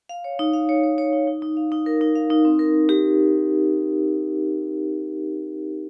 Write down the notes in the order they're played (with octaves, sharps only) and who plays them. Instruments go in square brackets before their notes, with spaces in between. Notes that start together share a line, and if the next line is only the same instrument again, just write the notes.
[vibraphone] F5
C#5
D#4
F5
C#5
C#5
C#5
D#4
D#4
D#4
F5
D#4
A#4
D#4
F5
D#4
C4
A#4
A#4
G4